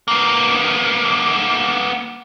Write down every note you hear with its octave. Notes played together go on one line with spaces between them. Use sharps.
A#3 B3